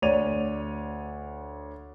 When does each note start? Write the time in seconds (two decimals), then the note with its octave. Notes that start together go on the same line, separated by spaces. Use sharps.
0.02 D2 C#5 D5 D#7 F7